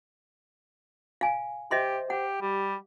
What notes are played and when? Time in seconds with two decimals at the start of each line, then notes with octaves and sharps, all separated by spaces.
1.21 F5 G#5
1.71 G4 C5 D#5 E5 C6
2.10 G4 F#5
2.42 G3 G4